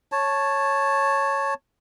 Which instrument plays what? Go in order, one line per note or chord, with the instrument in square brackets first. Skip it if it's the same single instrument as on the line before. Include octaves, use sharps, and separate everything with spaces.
[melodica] C#5 A5